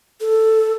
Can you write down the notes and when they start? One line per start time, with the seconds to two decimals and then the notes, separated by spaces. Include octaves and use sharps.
0.21 A4